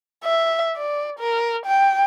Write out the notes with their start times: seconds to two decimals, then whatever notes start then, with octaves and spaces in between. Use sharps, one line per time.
0.24 E5
0.77 D5
1.20 A#4
1.66 G5